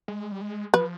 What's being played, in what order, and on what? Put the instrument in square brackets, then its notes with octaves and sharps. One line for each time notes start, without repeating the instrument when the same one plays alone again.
[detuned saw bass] G#3
G3
G#3
[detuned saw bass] F3 [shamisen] B4